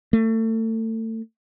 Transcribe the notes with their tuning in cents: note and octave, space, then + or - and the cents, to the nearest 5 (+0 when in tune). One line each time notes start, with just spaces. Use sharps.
A3 +30